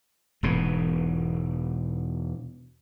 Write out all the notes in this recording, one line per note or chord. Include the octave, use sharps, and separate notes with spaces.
E1 G#2 B2